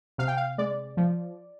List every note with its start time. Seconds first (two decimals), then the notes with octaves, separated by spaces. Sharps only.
0.18 C3 F5
0.28 G5
0.37 F5
0.58 G#3 D5
0.97 F3